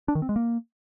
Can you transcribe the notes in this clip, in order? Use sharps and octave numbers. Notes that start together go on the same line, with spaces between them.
D4
D#3
C4
G#3
A#3